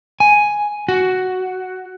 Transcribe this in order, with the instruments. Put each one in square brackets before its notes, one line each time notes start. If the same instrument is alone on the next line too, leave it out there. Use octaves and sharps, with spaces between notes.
[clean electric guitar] G#5
F#4